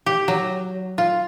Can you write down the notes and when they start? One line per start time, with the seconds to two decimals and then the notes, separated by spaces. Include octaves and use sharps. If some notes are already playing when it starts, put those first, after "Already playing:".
0.06 G4
0.28 F#3
0.98 F4